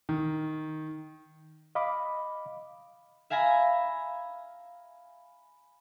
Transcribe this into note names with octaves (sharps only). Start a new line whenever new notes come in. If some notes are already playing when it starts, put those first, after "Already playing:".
D#3
D#5 F5 B5 D6
E5 F5 G#5 A#5 B5